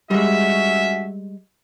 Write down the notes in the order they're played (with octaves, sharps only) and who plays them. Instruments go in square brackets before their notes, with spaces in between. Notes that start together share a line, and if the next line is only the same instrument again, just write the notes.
[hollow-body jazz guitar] G3 G#3 [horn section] C#4 F#4 E5